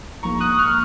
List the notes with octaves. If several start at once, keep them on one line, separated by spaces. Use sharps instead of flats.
A#1 G#2 F3 A#3 A#5 C#6
D#6 F#6
C#6 F6